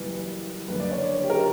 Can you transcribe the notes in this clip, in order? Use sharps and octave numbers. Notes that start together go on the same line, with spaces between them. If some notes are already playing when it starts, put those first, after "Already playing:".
Already playing: F#1 F#2 E3 G3 B4
F#1 F#2 D3 B4
D5
C#5
G4
A#4